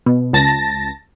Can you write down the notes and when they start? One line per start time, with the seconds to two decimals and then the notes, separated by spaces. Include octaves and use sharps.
0.06 B2
0.33 C#2 A5 A6 A#6